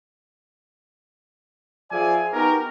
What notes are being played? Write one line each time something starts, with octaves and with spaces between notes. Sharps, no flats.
F3 G#4 D5 E5 F5 G#5
B3 D#4 F#4 G4 A#4